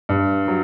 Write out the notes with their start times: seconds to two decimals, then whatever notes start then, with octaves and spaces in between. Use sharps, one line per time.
0.09 G2
0.48 F#3